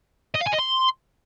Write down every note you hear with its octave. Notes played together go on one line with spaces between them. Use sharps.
D#5
F5
G#5
D#5
C6